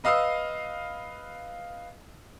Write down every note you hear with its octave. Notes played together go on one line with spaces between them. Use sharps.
B4 D#5 F5 D#6 E6 C7